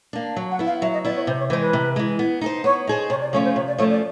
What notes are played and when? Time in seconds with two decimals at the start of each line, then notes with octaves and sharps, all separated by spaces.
0.13 A#3 D4
0.36 F#3
0.51 F#5
0.59 B3 E4
0.67 F5
0.82 F#3 E5
0.94 D#5
1.05 B3 E4 D5
1.16 C#5
1.27 C3 C5
1.39 C#5
1.50 E3 G#3 C5
1.62 B4
1.73 C3
1.96 E3 G#3
2.19 B3
2.41 D#4 G#4 C5
2.64 B3 C#5
2.87 D#4 G#4 C5
3.10 C3 C#5
3.21 D5
3.33 F3 A3 C#4 F4 C#5
3.45 C5
3.56 C3 C#5
3.68 D5
3.78 F3 A3 C#4 F4 C#5
3.90 D5